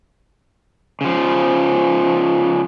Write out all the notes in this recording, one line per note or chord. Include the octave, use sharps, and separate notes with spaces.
C#3 F3